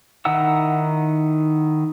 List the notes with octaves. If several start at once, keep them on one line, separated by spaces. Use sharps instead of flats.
D#3 D#4 E4 F#5 E6